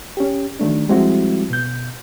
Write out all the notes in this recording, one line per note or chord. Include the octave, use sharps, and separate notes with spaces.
C#4 G4
D#3 F#3 A3 D4
F3 G3 G#3 C4 E4 F#4
B2 G6